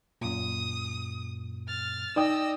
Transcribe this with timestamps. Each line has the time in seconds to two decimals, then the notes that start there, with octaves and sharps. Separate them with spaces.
0.21 F#2 A#2 D#6
1.68 F6 A6
2.16 D#4 D5 D#5 G5 D#6 E6